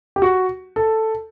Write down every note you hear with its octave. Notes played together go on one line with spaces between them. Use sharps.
G4
F#4
A4